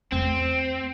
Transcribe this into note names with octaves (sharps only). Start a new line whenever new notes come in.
E2 A3 C4